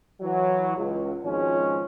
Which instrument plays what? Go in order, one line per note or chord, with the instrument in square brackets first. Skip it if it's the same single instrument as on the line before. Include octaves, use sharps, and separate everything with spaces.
[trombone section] E3 F#3
C#2
G#1 F3 G#3 C#4